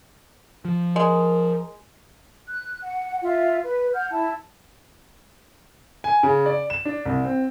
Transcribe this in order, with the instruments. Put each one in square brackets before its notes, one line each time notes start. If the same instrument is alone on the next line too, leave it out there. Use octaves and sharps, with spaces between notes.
[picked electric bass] F3
[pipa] G#3 [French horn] A#4
[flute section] F#6
F#5
F4 E5
B4
F#5 F6 G6
E4 A5
[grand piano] G#5
C#3
D5
E7
D4
C2
C4